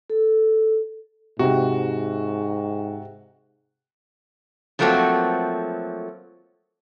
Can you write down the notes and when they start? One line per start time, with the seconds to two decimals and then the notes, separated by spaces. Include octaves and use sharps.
0.10 A4
1.39 G#2 C3 F#4
4.79 F3 F#3 A3 A#3 C4 F#4